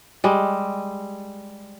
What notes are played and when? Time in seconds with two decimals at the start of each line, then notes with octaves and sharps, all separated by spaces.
0.24 G3 G#3